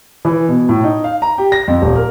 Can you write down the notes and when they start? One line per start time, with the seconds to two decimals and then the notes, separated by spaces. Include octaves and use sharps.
0.25 E3
0.49 B2
0.69 A2
0.84 D#4
1.04 F5
1.22 A#5
1.38 G4
1.52 A#6
1.68 F2
1.82 D#1
1.96 A#4